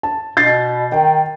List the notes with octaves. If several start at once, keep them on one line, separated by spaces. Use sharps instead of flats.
A5
B2 G6 A6 C7
D#3 G5